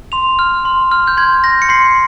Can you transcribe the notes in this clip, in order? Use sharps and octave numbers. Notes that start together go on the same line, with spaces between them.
C6 F7
F6
C6
F6
G6
C6 G#6
G6 A#6
C#7
C6 C7